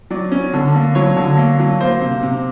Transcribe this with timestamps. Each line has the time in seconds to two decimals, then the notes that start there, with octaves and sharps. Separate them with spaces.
0.10 F#3 D5
0.32 C#4
0.54 D3
0.75 A#3
0.95 F#3 C#5
1.16 D3
1.37 A#3
1.59 F#3
1.80 A#3 C5
2.01 C3
2.23 C3